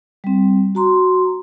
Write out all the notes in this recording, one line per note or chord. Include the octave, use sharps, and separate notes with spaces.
G3 C4
F#4 A#5 C6